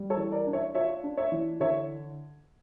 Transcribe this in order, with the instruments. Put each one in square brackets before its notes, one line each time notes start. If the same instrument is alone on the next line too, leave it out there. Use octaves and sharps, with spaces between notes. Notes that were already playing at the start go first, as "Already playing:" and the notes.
Already playing: [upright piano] G3
A4 C#5
E3
A#4 D5
D4
C#5 E5
F4 C#5 E5
D4
C#5 E5
E3
D3 C#5 E5